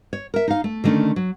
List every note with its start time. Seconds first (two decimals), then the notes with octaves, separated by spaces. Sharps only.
0.13 C#5
0.34 A#4 E5
0.48 D#4 F5
0.64 A3
0.84 D3 D#3 A3 C#4
1.16 F#3